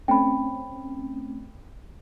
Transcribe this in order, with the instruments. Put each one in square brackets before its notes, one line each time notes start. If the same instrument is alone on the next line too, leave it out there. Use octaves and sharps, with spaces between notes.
[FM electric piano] A3 C4 C#4 [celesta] G5 B5